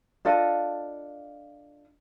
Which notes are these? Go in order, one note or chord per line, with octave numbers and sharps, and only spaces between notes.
D4 F4 A4 D#5